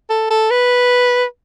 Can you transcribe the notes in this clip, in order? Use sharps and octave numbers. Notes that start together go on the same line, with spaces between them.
A4
A4
B4